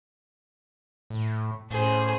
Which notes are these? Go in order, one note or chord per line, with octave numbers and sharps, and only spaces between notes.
A2
A2 C#4 G#4 C5